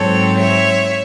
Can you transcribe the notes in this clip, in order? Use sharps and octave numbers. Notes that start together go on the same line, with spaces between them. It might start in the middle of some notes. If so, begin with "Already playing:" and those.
Already playing: G#2 F#3 C4 A4 C#5
C#5 E5